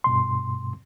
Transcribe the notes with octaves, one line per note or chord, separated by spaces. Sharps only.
G2 B2 C6